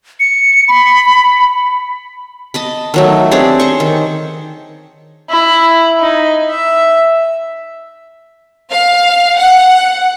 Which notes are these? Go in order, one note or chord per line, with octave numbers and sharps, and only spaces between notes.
C#7
B5
D#5 A5 B5
D#3 F#3 A3
C4 D4 G4 G#4
C5 C#6
D#3
E4
D#4
E5
F5
F#5